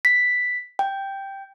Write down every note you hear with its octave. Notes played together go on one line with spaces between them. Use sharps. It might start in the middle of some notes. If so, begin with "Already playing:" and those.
B6
G5